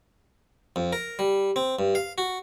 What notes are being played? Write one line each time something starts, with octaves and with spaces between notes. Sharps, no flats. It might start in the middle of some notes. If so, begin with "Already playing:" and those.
F2
A#4
G3
C4
G2
F5
F#4